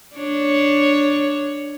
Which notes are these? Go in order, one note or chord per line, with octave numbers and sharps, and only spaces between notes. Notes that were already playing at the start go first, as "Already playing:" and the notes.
D4 C#5